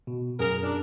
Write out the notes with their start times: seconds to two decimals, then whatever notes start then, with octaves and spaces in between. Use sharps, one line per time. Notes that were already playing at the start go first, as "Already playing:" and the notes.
0.07 B2
0.40 F#2 G#4 A#4
0.64 D4